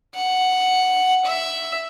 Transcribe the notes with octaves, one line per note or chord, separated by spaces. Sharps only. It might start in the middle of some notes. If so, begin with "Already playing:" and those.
F#5
E5